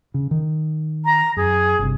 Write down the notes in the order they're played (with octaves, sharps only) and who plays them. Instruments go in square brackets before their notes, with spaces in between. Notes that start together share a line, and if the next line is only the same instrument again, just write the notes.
[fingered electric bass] C#3
D#3
[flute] A#5
[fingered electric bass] F#2 [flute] G#4
[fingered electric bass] G1 C3